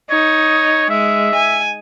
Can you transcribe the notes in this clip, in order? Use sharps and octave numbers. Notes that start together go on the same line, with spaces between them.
D#4 C#5
G#3 E5
G#5